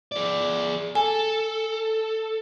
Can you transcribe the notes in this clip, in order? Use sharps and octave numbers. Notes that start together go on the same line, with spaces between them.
G#4 D5
A4 G#5